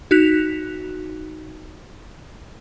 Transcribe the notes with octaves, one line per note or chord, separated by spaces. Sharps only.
D#4 F#4 F#6 B6 F7